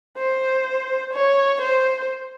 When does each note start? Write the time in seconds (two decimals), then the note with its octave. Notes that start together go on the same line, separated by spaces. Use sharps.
0.18 C5
1.14 C#5
1.62 C5